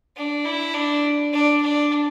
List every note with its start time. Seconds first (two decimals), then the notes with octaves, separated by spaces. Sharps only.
0.16 D4
0.45 E4
0.74 D4
1.33 D4
1.61 D4